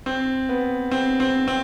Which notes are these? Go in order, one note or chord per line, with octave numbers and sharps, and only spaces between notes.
C4
B3
C4
C4
C4